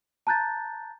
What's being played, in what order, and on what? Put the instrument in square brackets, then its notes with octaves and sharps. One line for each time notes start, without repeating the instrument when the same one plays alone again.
[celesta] A5 A#5 F#6 G6 A6